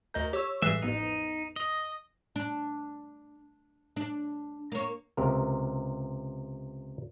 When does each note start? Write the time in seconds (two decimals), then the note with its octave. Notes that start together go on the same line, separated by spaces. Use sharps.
0.14 D2 A#4 D#5 G6
0.33 G4 C#5 E6
0.62 A1 G2 E3 G#3 E5 F#6 C7
0.82 A1 F2 B3 D#4
1.56 D#5
2.36 D4
3.96 D4
4.72 A#3 C#5
5.17 C#2 C3 A#4